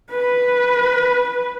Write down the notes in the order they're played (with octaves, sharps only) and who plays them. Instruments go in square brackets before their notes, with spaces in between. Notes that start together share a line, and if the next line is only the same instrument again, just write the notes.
[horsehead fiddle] B4